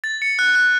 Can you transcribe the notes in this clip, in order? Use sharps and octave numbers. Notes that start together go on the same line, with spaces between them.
A6
C#7
F#6
F#6